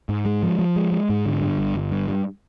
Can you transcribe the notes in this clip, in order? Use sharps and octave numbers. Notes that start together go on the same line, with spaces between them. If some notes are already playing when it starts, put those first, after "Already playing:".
G#2
G#3
F3
F3
G#3
G#3
G#2
D3
G2
G1
G1
G2
G2